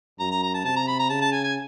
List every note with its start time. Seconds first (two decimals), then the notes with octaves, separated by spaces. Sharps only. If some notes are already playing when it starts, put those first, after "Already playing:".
0.20 F#2 A#5
0.31 A#5
0.43 A#5
0.54 A5
0.64 C3 A5
0.76 A#5
0.87 B5
0.99 A#5
1.10 C#3 A5
1.21 A5
1.32 G#5
1.44 G#5